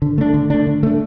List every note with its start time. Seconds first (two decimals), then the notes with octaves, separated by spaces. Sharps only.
0.02 D3
0.18 A3 D4
0.34 D3
0.50 A3 D4
0.67 D3
0.83 A3 D4